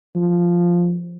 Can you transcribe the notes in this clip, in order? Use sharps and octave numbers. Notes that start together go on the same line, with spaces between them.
F3